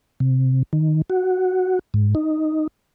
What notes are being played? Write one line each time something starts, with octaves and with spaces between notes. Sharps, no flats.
C3
D#3
F#4
G#2
D#4